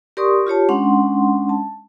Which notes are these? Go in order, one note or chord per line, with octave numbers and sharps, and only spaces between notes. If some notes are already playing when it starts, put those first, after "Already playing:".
G4 A#4 D5 C6 C#6 D#6
F4 G4 C#5 A5
G#3 C#4 D4 F#5 C6
A5